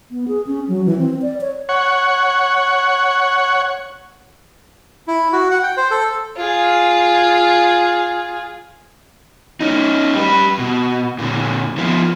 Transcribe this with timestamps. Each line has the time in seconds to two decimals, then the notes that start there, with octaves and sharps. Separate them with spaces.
0.11 B3
0.28 G#4
0.47 C#4
0.68 F#3
0.86 E3
0.98 C4
1.22 D5
1.41 C#5
1.69 C#5 F#5
5.08 E4
5.33 F#4
5.51 F#5
5.63 G5
5.77 C5
5.91 A4
6.37 F4 G#4
9.61 C#4 D#4
10.15 G3 B4
10.59 B2
11.19 A#2 D3
11.78 F3 B3